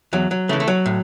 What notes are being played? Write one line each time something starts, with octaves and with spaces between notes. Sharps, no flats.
E2 F#3
F#3
C#3 E3 A3
A3
F#3
A2